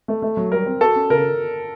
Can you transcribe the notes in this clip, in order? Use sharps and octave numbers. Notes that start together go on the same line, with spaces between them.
A3
A3
F#3
G3 A#4
C4
F#4 A4
C#4
C#3 A#4